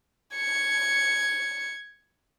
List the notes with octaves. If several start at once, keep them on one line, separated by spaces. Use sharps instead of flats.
G#6 C#7